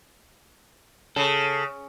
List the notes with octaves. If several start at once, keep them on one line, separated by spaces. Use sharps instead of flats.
C#3 A4